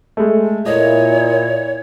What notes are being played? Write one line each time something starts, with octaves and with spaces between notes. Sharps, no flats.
G#3 A3
A#2 E4 C#5 D#5